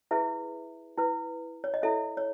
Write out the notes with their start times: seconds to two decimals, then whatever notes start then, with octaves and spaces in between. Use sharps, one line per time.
0.11 E4 G#4 B4 E5
0.97 E4 B4
1.64 C#5
1.74 D#5
1.82 E4 A4 C#5 E5
2.17 C#5